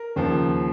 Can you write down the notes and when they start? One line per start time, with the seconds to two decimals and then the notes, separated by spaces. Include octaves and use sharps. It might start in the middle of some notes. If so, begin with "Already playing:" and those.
Already playing: A#4
0.16 D#2 C#3 F3 A#3